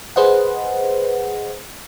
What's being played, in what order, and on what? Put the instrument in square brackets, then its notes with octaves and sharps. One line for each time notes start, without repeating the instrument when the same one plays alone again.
[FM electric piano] G#4 B4 C5 D#5 F#5